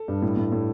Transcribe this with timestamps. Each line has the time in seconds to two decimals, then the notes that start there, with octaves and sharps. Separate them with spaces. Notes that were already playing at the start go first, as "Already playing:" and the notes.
Already playing: A4
0.08 G2
0.22 A2
0.37 A2
0.52 A2